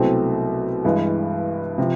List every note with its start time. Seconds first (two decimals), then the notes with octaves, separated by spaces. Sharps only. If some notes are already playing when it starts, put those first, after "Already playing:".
Already playing: C2 B2 F#3 A3 C4
0.84 G2 E3 G#3
1.78 C3 F3